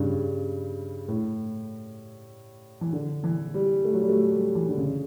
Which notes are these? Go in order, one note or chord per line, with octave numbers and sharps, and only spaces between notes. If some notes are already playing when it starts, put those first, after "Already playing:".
Already playing: G2 C#3
A2
E3
D3
E3
G3
A3
F#3
G3
A3
G3
E3
D3
C#3